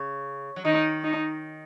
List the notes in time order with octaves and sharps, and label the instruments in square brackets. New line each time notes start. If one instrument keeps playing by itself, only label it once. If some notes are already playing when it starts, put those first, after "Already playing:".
Already playing: [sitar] C#3
F#3
[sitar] D#3 [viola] D#4
[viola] D#4